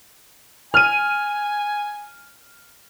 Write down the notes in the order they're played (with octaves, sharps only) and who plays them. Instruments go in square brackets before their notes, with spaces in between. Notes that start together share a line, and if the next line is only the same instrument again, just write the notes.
[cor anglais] G#5 [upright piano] F6 D#7